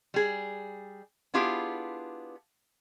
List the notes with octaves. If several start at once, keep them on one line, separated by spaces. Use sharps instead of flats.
G3 G#4
B3 D4 E4 F4 G4 G#4